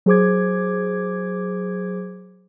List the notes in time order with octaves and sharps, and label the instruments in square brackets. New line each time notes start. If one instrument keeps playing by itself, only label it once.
[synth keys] F#3 G#4 C5 D6 G#6